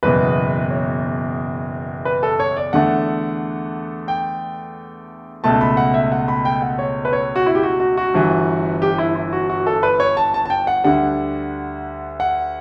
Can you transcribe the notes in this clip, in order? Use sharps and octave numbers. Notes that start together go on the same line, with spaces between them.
F#1 E2 B2 B4
C#5
B4
A4
C#5
D5
E2 D3 A3 F#5
G5
C#2 B2 A3 A5
B5
F#5
E5
F#5
B5
G5
F#5
C#5
B4
C#5
F#4
E4
G4
F#4
F#4
F#4
G1 G2 E3
G4
E4
E4
F#4
F#4
A4
B4
C#5
A5
A5
A5
G5
F#5
D2 D3 G3 F#5
F#5